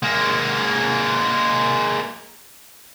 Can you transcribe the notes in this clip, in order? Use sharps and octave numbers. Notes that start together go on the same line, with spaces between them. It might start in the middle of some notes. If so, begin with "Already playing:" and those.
G#3 A#3